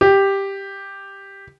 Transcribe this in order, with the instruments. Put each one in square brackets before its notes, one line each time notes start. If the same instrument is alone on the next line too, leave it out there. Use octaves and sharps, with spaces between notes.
[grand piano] G4